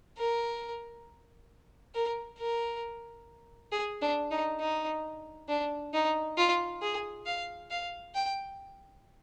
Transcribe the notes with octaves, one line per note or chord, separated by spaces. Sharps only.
A#4
A#4
A#4
G#4
D4
D#4
D#4
D4
D#4
F4
G#4
F5
F5
G5